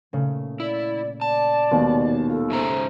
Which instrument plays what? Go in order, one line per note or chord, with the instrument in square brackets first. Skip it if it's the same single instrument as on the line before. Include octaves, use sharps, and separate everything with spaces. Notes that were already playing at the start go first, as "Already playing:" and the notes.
[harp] A#2 C#3 A3
[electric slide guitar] E4 [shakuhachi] D5
[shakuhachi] D5 [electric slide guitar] A5
[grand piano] D#2 B2 [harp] D#3 G#3
[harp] F4 [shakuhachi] A4
[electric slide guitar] G#2 C#3 A#5 [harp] C5 E5